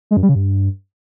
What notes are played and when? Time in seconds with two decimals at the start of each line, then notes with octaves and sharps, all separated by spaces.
0.11 G#3
0.17 F#2
0.23 G3
0.29 C#3
0.35 G2